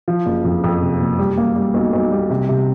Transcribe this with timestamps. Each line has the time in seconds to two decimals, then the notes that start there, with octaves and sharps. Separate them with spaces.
0.08 F3
0.26 F#1
0.45 F2
0.64 F2
0.81 C3
1.01 F#1
1.19 G3
1.38 A#3
1.56 G3
1.74 B1
1.93 B1
2.11 G3
2.30 C3
2.49 C3